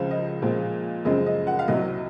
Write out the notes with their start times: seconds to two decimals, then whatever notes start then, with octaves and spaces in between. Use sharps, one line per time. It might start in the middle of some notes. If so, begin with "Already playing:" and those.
Already playing: C#2 C#3 F3 C4 F5
0.11 D#5
0.42 A#2 F3 G#3 C4
1.05 F#2 C#3 F3 G#3 C4 D#5
1.26 D#5
1.47 F#5
1.59 F5
1.68 C2 C3 F#3 D#5